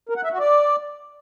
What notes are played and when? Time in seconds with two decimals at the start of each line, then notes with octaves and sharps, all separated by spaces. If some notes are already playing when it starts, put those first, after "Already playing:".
0.09 A#4
0.16 F#5
0.24 E5
0.31 F#4
0.39 D5